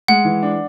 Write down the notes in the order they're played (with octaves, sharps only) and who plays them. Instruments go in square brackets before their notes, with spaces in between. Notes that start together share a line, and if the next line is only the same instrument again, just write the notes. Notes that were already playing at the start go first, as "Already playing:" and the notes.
[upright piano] G#3 [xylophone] F#5
[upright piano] E3
D4